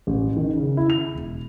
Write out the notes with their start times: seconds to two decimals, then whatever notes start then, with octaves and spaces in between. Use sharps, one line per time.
0.07 A1
0.37 D#3
0.56 C#3
0.77 E4
0.90 F7
1.15 E1